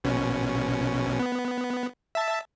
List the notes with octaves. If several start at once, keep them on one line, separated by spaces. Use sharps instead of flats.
A#1 B2 C#4
B3
E5 A5